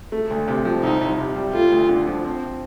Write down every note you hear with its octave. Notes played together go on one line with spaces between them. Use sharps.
A3
D2
C3
F3
C2 D#4
C2
C3
G3
A3 F4
D2
D3
F3
C4